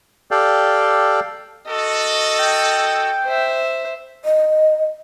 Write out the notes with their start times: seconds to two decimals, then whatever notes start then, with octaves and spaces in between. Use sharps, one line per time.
0.31 G4 A4 D5 F5 G5
1.68 F#4 A4 D#5
2.39 G5
3.25 C5 E5
4.25 D#5